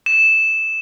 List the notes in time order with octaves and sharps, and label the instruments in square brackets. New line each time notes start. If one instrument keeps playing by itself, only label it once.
[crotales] E7